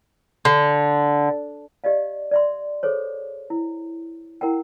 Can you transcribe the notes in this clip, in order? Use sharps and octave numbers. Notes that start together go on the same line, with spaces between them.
D3
G4 D5 D#5 F5
D5 E5 C6
G#4 A4 C5 C#5
E4
E4 A#4 F#5 G5